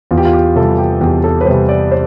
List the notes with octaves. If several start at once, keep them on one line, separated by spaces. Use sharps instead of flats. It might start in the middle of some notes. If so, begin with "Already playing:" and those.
E2 F4
G4
F4
G4
C3 G3 A4
G4
E2 G4
A4
B4
C3 G3 C5
D5
C5